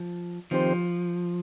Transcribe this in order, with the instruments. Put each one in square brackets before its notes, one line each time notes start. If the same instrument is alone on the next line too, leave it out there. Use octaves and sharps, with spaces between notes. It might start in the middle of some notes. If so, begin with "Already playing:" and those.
Already playing: [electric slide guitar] F3
[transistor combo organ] D#3 C4 G4 C5 [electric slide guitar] F3